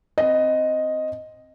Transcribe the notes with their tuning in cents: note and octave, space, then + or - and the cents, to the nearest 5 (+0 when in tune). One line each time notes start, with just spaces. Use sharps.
C4 +0 D#5 +0